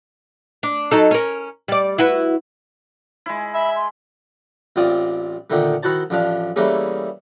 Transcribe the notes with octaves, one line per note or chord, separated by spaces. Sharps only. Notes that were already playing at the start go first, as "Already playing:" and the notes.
D4
F#3 D#4 A4
C#4 A#4
G3 D5
E4 F#4 B4
G#3 E4
E5 B5
C6
A1 C4 F4 D5 D#6
A#2 D3 D#3 A3
D#3 E4 F#4 C5 A5
A1 F3 D4 F5
E3 G3 A3 A#3 C#4 G#4